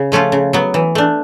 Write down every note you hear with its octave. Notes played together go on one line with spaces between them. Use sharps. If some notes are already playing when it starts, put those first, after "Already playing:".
Already playing: C#3
F3 A3 C#4 F4
C#3
F#3 B3
E3
A3 D4